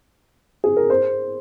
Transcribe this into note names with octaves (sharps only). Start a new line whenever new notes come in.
G#4
A#4
C5